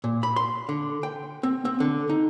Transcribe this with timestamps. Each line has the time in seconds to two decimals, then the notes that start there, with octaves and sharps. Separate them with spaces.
0.04 A#2
0.23 B5
0.36 C6
0.69 D3
1.03 G5
1.43 C4
1.65 C4
1.80 D3
2.09 D#4